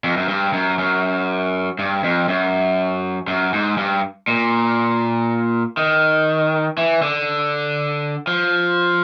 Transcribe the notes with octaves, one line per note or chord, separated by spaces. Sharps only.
F2
F#2
G2
F#2
F#2
G2
F2
F#2
F#2
G#2
G2
A#2
D#3
E3
D3
F3